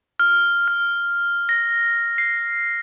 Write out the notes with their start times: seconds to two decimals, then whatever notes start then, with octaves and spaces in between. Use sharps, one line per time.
0.20 F6
0.68 F6
1.49 A#6
2.18 C7